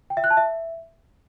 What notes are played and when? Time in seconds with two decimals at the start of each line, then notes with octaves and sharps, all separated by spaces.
0.10 G5
0.17 E5
0.24 F#6
0.30 A5
0.37 E5